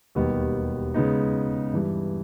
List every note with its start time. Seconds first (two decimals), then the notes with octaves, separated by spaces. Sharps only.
0.15 E1 D#2 D#3 G3 B3
0.94 C#3 G#3 B3 D#4
1.74 G2 E3 G3